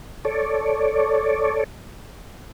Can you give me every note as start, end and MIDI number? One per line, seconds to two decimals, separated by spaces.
0.25 1.64 69
0.25 1.64 73
0.25 1.64 74